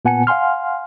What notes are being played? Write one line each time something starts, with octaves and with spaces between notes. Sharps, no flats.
A#2 B3 F#5 G#5 A5 C#7
F5 F#5 G#5 C6 F6